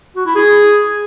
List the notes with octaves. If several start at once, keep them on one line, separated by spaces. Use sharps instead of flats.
F#4
E4
G#4